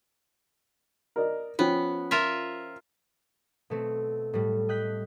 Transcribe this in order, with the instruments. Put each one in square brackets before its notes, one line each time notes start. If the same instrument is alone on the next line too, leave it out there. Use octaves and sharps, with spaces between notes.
[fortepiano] A#4 D5 D#5
[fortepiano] F3 C#4 G5 [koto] B3
[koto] F4 A#4 E5
[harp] B2 A3 C4
A2 G3
D#5 G5 F#6 G6 B6